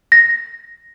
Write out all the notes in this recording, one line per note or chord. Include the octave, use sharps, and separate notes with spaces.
A#6